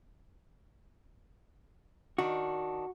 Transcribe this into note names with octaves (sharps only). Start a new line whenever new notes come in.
D#3 D4 F#4